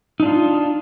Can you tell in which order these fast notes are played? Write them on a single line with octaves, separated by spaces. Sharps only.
D#4 D4 F4